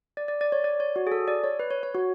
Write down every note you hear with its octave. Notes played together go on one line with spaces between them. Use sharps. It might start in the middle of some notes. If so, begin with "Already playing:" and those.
D5
D5
D5
C#5
D5
C#5
F#4
G#4
A4
D5
C#5
B4
C#5
C#5
F#4